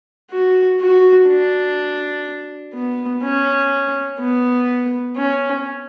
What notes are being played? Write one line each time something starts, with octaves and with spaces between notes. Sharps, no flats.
F#4
F#4
D4
B3
C#4
B3
C#4